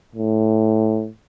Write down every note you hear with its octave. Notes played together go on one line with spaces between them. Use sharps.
A2